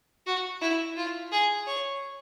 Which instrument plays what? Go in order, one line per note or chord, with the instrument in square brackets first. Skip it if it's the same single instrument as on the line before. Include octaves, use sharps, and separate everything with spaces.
[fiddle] F#4
E4
F4
G#4
C#5